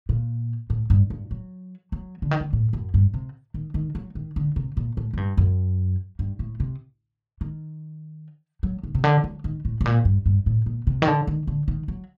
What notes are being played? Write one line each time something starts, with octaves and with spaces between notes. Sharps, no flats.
A#2
A2
G2
G2
F#3
F#3
D3
D#3
D3
A2
F#2
G2
C3
D#3
D#3
F#3
D#3
D3
C3
A#2
A2
A2
G2
F#2
G2
A2
C3
D#3
F#3
D#3
C3
D3
F#3
D#3
A2
A2
A#2
G2
G2
A2
A#2
C3
D#3
D3
D#3
D3
D#3
F#3